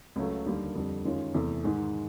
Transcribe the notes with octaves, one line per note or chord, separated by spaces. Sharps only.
C#2 C#3 F#3 A3
D#2 D3 G3 A#3
F2 D3 G3
F#2 D#3 G#3 C#4 F4
E2 C3 E3 A3
G#2 D#3 G#3